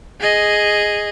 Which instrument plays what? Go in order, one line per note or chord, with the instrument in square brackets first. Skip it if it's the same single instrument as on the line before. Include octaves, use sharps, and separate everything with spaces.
[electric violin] G#4 D#5